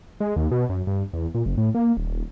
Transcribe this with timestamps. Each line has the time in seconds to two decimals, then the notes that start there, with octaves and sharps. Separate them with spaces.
0.20 G#3
0.36 D#2
0.51 B2
0.69 F#2
0.87 G2
1.14 E2
1.35 A#2
1.46 F#1
1.58 A2
1.75 A#3
1.97 D#1